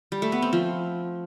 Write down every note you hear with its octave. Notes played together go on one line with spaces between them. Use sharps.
G3
A3
B3
C4
F3